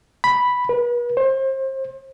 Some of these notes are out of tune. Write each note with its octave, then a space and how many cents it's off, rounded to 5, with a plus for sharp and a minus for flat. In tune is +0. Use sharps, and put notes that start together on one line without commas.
B5 +0
B4 -40
C5 +30